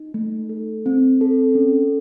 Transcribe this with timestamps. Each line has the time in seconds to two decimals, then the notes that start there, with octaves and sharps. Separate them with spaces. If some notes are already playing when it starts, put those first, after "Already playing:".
Already playing: D#4
0.14 A3
0.49 A4
0.86 C4
1.21 A4
1.55 C#4